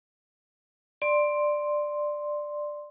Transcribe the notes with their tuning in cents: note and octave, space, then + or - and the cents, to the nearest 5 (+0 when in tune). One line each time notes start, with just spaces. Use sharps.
D5 +10 C6 +0